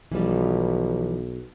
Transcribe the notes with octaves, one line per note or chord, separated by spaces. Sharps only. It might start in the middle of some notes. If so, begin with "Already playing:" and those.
B1 E3 F3 G3